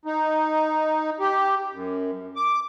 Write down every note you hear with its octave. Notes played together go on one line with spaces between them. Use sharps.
D#4
G4
F#2
D6